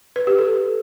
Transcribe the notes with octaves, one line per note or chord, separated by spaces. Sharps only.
B4
G4
A4